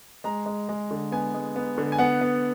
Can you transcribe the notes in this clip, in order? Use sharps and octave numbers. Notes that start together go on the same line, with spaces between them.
G#3 A#5
G#3
G#3
D3
B3 G#5
G#3
B3
D3
G#5
B3 F#5
B3